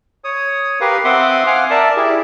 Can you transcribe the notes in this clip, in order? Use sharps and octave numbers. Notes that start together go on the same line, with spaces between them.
C#5 D#6
G4 A#4 B4 F5
C4 E5 F#5 C6 D6 D#6
F5 F#5 G#5 D6 F6
A#4 D5 E5 A5
E4 G4 G#4